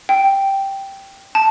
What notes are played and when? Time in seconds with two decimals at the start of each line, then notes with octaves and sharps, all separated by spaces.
0.09 G5
1.35 A5